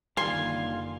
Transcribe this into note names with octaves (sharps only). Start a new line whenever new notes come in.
F#1 D3 D#3 G3 A#3 F4 G#5 C6